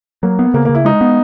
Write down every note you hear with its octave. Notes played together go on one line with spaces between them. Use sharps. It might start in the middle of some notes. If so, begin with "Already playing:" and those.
F#3 A#3
B3
C#3 A#3
C#3 A#3
E4
G#3 D#4
B3